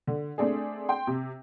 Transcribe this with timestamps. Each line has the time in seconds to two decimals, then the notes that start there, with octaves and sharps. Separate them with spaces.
0.07 D3
0.38 A3 C4 D4 G#4
0.89 G5 C6
1.07 C3